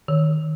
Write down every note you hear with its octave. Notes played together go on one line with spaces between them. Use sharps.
D#3